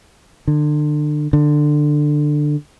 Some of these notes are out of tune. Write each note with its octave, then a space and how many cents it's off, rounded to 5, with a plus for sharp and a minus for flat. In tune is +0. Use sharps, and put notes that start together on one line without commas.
D3 +30
D3 +15